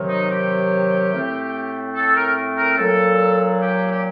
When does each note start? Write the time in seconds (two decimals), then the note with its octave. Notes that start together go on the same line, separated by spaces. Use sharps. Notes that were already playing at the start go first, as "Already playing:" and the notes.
Already playing: C3 D#3 F#3
0.09 D#4
0.30 G4
1.12 A2 A3 C4
1.95 A4
2.15 A#4
2.57 A#4
2.77 A#2 F#3 A#3 A4
3.60 G4
3.91 G4